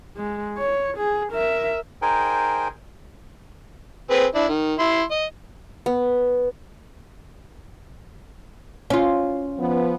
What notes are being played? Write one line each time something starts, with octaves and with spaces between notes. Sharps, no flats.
G#3
C#5
G#4
A#4 E5
D#4 G#4 A#4 C5 G5 G#5
C4 G#4 B4
D4 E4
D#3
E4 C6
D#5
B3
C#4 F4
F3 B3